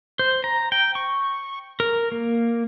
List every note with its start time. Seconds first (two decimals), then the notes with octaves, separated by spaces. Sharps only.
0.19 C5
0.44 A#5
0.72 G5
0.95 C#6
1.80 A#4
2.12 A#3